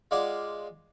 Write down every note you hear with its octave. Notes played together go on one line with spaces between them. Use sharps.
G#3 F4 D5 F5 F#5 G#5